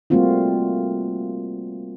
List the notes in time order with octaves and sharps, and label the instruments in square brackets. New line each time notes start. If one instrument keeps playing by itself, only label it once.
[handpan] G3 A3 A#3 C4 F4 F#4